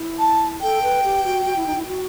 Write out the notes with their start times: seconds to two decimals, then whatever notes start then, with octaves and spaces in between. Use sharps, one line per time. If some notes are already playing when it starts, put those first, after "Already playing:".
Already playing: E4
0.19 A5
0.61 A4 G5
0.83 B4
1.03 G4
1.24 F#4
1.45 F#4
1.56 E4
1.66 D#4
1.76 E4
1.87 F#4